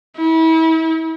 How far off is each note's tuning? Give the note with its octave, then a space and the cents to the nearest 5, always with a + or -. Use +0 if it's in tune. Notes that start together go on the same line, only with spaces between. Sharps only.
E4 -35